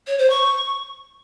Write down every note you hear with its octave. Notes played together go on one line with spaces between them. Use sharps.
C#5
C5
C#6